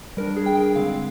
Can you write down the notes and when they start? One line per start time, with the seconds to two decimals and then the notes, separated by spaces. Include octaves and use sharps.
0.17 G3 D4 A#4
0.36 G#4
0.46 G5
0.76 D3 G#3 C4 F5